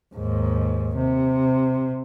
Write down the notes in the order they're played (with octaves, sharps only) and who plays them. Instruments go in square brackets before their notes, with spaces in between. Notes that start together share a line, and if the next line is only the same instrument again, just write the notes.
[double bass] D#2 G#2
C3